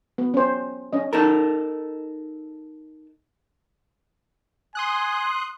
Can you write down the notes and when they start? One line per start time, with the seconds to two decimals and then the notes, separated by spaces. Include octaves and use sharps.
0.18 B3
0.34 C#4 C5
0.93 C#4 D4 D#5
1.13 D#4 A4 A#4
4.75 G#5 C6 D#6 F#6